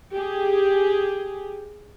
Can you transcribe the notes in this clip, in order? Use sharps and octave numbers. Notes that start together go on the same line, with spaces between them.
G4 G#4